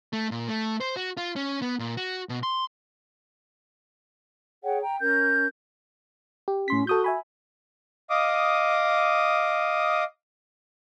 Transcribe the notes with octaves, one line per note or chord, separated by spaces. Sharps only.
A3
A#2
A3
C5
F#4
F4
C#4
B3
A#2
F#4
B2
C6
G#4 C#5 F#5 G5
G5 A#5
C#4 A#4 G6
G4
A2 C#4 C6 B6
F#4 A4 D#6 G6
E5 G#5 B5
D#5 F5 D6 D#6